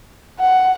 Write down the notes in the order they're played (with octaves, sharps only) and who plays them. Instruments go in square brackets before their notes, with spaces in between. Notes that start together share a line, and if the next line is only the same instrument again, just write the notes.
[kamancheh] F#5